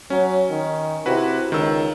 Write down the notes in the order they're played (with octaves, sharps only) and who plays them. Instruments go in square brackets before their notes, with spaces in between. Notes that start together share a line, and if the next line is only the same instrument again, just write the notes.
[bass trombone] F#3 [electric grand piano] C#4
[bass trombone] D#3
[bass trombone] C3 [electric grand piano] E4 F#4 B4
[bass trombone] C#2 [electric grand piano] D#3 E6